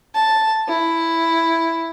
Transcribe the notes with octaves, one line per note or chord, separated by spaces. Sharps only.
A5
E4